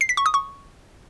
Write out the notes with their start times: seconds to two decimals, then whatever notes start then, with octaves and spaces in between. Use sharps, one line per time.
0.01 C7
0.09 B6
0.17 C#6
0.26 D#6
0.34 C#6